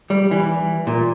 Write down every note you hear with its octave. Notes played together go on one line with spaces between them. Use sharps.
G3
E3
A#2